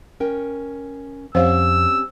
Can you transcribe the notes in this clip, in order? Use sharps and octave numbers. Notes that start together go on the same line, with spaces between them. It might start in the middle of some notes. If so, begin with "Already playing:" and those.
C#4 A#4 G5
F2 G3 C4 C#4 C5 F5 E6